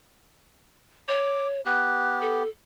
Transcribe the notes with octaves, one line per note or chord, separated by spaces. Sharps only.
C#5 D6
B3 G4 F#6
A4